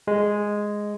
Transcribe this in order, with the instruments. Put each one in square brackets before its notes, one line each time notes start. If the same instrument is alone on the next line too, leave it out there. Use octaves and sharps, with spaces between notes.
[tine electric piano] G#3